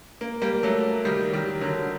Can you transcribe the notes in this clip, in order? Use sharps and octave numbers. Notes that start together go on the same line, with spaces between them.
A#3
G3 A#3
F#3 A3
D#3 G3
D#3 G3
D3 F#3